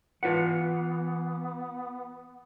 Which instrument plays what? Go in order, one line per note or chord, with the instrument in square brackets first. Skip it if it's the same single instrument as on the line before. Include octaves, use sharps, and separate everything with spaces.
[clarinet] E3 [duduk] B3 [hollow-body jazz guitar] F4 B4 F#5